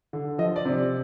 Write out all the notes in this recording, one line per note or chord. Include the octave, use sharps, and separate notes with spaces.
D3
F3 D#5
D5
C3